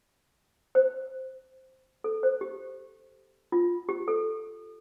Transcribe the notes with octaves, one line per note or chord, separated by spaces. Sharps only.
C5
A4
C5
G4
F4
G4
A4